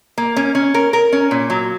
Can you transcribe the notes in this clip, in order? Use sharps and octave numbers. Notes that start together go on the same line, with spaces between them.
A#3
C#4
C#4
A#4
A#4
C#4
A#2
F#3